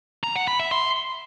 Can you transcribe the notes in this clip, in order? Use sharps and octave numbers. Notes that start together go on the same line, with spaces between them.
A#5
F#5
B5
E5
C6